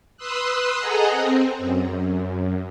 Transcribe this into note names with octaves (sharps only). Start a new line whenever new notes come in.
B4 C6 D#6 E6 F#6
G#4 A4 D#5 F#5 G#5 A#5
C4
F#2